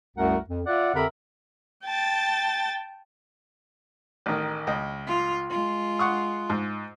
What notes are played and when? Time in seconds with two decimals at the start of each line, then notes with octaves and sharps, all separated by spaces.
0.17 C2 F#2 A3 F#4 A#4 F#5
0.50 F2
0.66 F4 D5 E5 F#5
0.95 F2 D3 G4 A#4 E5 B5
1.84 G5 A5 A6
4.26 A1 D#3
4.67 C#2 D#5
5.07 F4
5.50 G#3 F4
5.99 F#5 C#6 D#6
6.50 G#2